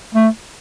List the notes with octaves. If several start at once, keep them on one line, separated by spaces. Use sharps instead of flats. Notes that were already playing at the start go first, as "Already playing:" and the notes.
A3